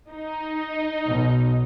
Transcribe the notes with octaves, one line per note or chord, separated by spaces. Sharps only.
D#4
B1 B2